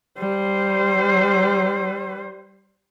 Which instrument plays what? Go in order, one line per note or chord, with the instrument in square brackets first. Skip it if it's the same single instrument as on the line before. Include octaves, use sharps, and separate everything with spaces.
[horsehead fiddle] G3 C5